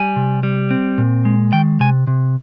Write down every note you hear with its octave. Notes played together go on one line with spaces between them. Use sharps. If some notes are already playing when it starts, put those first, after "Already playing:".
Already playing: G3 G#5
C3
G3
C4
A#2
G#3
D#3 G5
C3 G#5
C3